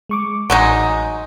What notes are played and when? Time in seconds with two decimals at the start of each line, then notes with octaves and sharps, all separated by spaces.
0.09 G#3 C#6 D6
0.50 A1 F#3 G#3 D#4